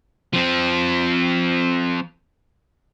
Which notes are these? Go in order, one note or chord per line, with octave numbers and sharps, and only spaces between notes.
F3 C4